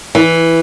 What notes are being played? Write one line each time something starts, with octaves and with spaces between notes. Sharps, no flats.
E3